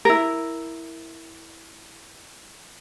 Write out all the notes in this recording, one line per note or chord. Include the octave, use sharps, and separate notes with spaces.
E4 A#4